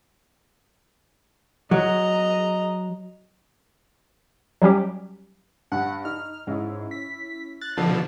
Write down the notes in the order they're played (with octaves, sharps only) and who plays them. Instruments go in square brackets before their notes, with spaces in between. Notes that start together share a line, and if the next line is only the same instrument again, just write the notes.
[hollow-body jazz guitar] F#3 [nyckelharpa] D#5 A#5
[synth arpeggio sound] F#3 G3 C#4 G4
[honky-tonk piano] G2 [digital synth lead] F#5
[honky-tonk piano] D#4 [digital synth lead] F6
[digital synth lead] G#2 [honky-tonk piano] C#4 E4
[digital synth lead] B6
[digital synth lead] F#6 [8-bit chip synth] A6
[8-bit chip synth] B2 D3 F3 [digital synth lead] A5